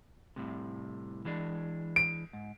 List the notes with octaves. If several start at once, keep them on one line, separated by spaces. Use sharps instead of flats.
C2 A2 C3
E3 G#3 D4
D7
G#2